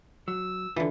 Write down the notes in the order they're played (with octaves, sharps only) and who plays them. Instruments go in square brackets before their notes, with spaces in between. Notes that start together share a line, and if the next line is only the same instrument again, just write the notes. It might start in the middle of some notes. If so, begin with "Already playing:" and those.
[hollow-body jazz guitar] F#3 [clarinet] E6
[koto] D3 E3 [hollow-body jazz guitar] F4